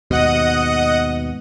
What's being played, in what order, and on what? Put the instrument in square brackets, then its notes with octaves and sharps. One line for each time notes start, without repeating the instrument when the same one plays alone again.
[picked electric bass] D#2 G#2 B2 [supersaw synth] D#5 F#5 D#6